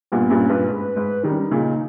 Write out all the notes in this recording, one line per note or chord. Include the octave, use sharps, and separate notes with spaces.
G2 A#2 B3
G2 A#2 C#4
G2 A#2 B4
G#2
G#2
D#3 G3 D#4
C#4
D#4
A#2 C#3